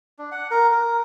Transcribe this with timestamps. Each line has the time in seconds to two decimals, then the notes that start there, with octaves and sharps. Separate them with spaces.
0.19 D4
0.32 F#5
0.51 A#4
0.72 A#4